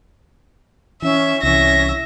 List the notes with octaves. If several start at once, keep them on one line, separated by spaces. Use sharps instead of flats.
E3 C#4 E5
C2 E3 C#4 E5 A#6